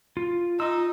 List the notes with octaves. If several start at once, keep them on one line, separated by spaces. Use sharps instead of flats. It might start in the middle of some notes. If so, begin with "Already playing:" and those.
F4
D#4 F4 D#5 C6 E6